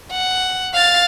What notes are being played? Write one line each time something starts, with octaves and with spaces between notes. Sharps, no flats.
F#5
F5 A6